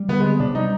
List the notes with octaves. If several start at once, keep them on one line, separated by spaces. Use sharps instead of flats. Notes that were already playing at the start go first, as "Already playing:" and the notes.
Already playing: G3
D3 B3
G#3 B3
C3 D4
G3 D#4